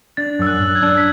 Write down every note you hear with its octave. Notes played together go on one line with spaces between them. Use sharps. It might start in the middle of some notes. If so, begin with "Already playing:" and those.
D4 A6
F#2 E6
F#6
F#2
G#6
D4
B6